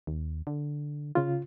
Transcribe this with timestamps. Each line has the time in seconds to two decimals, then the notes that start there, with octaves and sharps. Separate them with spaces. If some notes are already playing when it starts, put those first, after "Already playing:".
0.07 D#2
0.47 D3
1.15 C#3 F4